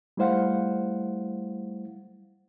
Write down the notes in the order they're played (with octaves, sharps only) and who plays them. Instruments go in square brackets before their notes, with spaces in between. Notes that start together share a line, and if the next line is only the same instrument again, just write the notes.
[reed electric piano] G3 A3 E4 C5 F5 F#5